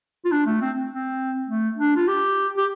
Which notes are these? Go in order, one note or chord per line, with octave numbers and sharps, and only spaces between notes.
F4
D4
A3
C4
C4
A3
D4
F4
G4
G4